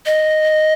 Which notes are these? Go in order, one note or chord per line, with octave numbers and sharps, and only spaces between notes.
D#5